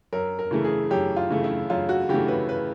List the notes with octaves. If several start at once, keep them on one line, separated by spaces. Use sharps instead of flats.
F#2 A#4
A#4
C#3 E3 A3
G#4
F#2 G4
F4
C#3 E3 A3
E4
F#2 F4
F#4
C#3 E3 A3 G4
B4
B4